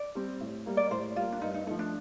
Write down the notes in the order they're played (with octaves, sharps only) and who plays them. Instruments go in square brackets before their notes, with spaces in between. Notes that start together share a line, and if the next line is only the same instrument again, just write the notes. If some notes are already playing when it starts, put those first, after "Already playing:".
Already playing: [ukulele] D5
[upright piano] G3 C4
A2
G3 A#3
[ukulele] D5
[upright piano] A2 [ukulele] C5
[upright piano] G3 A#3 [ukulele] F4
[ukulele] D4
[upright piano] G2 [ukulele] D#4
[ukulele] D#4
[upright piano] F3 A3 [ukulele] D#4
[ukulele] D4